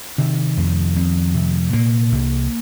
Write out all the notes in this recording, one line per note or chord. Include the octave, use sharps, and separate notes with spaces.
C3 D#3
F2
F2
C3
A#2 A#3
C2